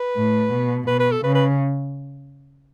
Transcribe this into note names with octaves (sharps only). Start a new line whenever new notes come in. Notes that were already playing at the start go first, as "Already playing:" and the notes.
Already playing: B4
A2
B2
B2 B4
B4
A4
C#3 B4
B4